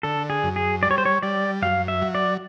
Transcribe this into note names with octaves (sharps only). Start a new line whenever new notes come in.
D3 A4
G#4
F#2
G#4
G3 D5
C#5
C5
C#5
G3 D5
F#2 F5
E5
F#3
D5